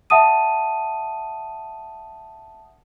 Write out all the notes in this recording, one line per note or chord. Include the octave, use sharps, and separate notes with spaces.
E5 F#5 A5 D#6 D#7